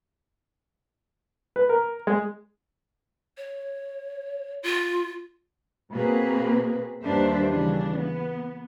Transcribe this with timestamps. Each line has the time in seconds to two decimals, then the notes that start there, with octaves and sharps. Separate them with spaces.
1.56 B4
1.69 A#4
2.07 G#3
3.37 C#5
4.63 F4
5.91 B2 A#3 C4 G#4 B4
7.02 D#2 G3 D4 B4 C5 E5
7.51 C#3 E3 G3 D4
7.97 B3